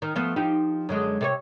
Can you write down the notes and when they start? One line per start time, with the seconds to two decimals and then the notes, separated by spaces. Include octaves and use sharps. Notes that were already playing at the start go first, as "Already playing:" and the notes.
0.02 D#3
0.15 F3 A3 B3
0.36 F3 D#4 G4
0.89 F#2 D3 G#3
1.21 C3 A4 C#5